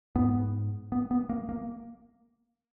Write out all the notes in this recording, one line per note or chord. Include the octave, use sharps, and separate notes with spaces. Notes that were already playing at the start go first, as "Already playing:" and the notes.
G#2 B3
B3
B3
A#3
A#3